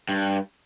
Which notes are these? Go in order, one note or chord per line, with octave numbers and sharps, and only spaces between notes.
G2